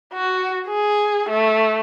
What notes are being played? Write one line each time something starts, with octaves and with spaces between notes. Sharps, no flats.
F#4
G#4
A3